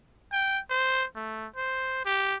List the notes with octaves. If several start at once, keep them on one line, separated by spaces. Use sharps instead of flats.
G5
C5
A3
C5
G4